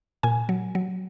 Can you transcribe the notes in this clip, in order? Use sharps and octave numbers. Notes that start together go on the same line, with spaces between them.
A#2 G#5
F#3
F#3